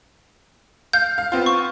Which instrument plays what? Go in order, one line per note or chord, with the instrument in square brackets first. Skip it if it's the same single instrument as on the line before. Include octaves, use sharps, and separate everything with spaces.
[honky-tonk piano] F5 [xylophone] G6
[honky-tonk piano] F5
B3 C4 F4
[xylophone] C#6